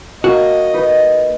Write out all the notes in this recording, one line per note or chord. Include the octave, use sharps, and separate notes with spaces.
A#3 F#4 D#5
D#4 B4